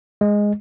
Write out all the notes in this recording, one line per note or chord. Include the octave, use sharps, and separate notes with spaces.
G#3